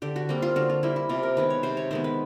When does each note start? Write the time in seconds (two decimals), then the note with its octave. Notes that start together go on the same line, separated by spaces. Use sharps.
0.02 D3 G4
0.16 F#4
0.29 G3 A#3 C4
0.42 F4
0.56 D3 F#4
0.70 F4
0.83 G3 A#3 E4
0.96 E4
1.09 C3 F4
1.23 A#4
1.37 D#3 G#3 B3 B4
1.50 C#5
1.63 C3 C5
1.77 C#5
1.91 D#3 G#3 B3 C5
2.04 B4